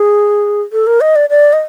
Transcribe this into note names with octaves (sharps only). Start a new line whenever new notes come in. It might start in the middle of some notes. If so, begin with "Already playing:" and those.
Already playing: G#4
A4
A#4
D#5
D5
D5
D#5